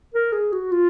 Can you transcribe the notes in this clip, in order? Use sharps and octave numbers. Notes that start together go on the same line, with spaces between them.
A#4
G#4
F#4
F4